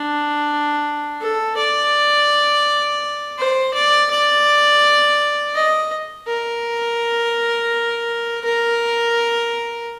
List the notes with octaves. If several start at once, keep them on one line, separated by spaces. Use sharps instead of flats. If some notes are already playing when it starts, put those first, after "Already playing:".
Already playing: D4
A4
D5
C5
D5
D5
D#5
A#4
A#4